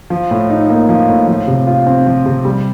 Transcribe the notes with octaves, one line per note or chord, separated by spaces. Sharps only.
F3
A2
D#4
A#3
F3
A2
F3
C3
F4
C4
F3
C3
G3